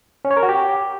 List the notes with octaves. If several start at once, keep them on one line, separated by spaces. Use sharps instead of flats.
C#4
C#5
A#4
F#4
G4